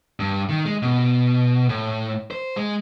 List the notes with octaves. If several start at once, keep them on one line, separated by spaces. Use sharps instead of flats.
G2
D#3
G#3
B2
A2
C5
G#3